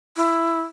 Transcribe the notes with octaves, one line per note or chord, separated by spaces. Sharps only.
E4